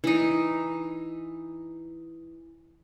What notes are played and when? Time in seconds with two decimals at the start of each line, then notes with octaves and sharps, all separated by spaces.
0.04 E3 D#4